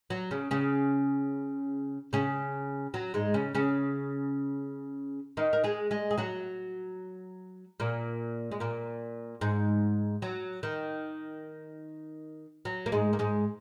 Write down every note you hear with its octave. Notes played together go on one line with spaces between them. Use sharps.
F#3 F#4
C#3 C#4
C#3 C#4
C#3 C#4
F#3
G#2 G#3
C#3 C#4
C#3 C#4
D#3 D#4
A#4
G#3 G#4
G#3 G#4
G#4
F#3 F#4
A#2 A#3
G#3
A#2 A#3
G#2 G#3
F#3
D#3
F#3
A#3
G#2 G#3
A#3
G#2 G#3